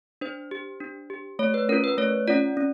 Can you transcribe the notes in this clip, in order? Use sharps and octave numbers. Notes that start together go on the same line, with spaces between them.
D4 C5
G4
D4
G4
A3 C#5
B4
C#4 F4 A#4
B4
A3 C#5
C#4 F4 D5
C#4